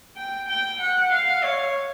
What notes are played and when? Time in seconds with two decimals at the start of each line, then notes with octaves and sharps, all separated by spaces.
0.17 G5
0.48 G5
0.80 F#5
1.12 F5
1.44 C#5